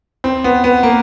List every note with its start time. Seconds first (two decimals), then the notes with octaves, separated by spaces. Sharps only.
0.24 C4
0.44 B3
0.64 B3
0.83 A#3